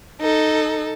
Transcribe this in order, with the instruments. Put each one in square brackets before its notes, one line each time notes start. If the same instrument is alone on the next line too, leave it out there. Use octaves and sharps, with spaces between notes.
[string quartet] D#4 A4